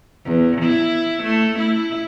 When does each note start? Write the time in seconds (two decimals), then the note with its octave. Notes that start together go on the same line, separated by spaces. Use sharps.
0.25 E2
0.61 E4
1.23 A3
1.59 E4